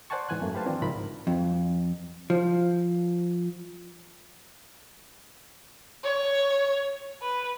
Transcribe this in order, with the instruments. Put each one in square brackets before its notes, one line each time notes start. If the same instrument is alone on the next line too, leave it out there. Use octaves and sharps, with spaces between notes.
[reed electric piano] C5 D5 F#5 G#5 A5 C#6
G#2 E3 G#5 F#6
F#2 A3 A#3
G4 B4 C5 F5 A5
D#3 E3 C4 D4 F4
C#2 G#2 F3 A#4 E5 B5
[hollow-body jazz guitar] F2
F3
[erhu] C#5
B4